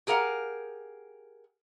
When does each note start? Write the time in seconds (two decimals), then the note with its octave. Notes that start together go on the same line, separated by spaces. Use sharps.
0.07 G4 G#4 A#4 F5 F#5